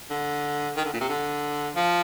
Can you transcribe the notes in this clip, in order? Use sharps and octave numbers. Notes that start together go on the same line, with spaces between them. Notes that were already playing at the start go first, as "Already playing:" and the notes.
D3
D#3
D3
A#2
C3
D3
F3